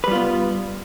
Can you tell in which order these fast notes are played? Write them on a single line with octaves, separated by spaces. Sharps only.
B4 G3 F4 B3